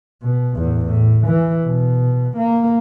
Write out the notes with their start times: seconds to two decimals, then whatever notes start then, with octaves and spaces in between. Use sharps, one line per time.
0.23 B2
0.56 E2 A2
0.85 A2
1.27 E3
1.66 B2
2.37 A#3